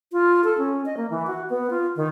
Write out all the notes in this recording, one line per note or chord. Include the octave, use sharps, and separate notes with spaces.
F4
A4
C#4
D#5
A#3
E3
F#4
B3
F4
D#3